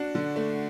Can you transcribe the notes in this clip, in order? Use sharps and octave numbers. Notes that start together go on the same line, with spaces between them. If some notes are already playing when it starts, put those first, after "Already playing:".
Already playing: D4 F#4
D3
A3